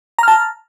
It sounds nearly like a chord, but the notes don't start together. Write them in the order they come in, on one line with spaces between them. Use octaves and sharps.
A#5 F6 A5